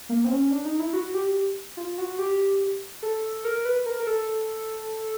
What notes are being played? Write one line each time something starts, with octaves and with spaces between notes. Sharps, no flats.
A#3
C4
C#4
D4
D#4
E4
F#4
G4
F4
F#4
G4
A4
A#4
B4
A#4
A#4
A4